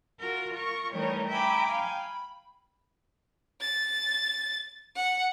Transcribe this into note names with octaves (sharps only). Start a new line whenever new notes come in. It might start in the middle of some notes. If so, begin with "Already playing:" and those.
F4 F#4 A#4
F4 A#4 C#6
E3 G3 A3 D#4 A#4 C#5
E5 G5 G#5 A#5 B5 D6
F5 G5 G#5
B5
A6
F#5